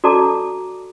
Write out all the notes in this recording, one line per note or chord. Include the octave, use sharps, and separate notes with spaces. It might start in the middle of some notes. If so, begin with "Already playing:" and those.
F#4 A4 D5 A5 A#5 D6